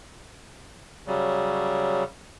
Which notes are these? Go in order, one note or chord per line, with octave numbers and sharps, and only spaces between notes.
C#3 F#3 G3